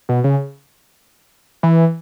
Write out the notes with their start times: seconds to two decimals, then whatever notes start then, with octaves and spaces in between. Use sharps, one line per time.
0.09 B2
0.24 C#3
1.63 E3